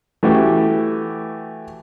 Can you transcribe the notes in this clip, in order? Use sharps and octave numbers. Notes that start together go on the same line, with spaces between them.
E3 A3 F#4 G4